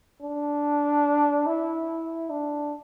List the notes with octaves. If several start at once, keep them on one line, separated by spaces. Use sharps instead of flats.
D4
E4
D4